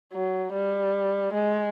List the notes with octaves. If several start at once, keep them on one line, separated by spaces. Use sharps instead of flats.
F#3
G3
G#3